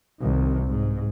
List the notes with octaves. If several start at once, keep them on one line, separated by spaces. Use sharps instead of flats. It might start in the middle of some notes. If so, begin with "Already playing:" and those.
C2 D#3
G#2